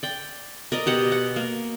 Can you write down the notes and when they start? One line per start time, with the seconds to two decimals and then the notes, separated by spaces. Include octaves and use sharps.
0.03 D5 G5
0.72 A#4 D5 D#5
0.86 B2 G4 F#5
1.12 F#5
1.36 A#3